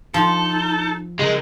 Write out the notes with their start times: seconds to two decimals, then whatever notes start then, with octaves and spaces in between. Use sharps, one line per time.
0.14 F3 D#4 A4
1.19 C#3 G#3 A#4